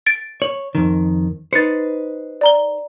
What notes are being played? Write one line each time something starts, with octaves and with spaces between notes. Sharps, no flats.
A6 D7
C#5 F#7
F2 D#3
D#4 B4 C5 A6 C#7
D5 A#5 G7